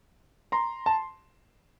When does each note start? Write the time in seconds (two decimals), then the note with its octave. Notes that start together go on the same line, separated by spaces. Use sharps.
0.52 A#5 C6
0.86 A5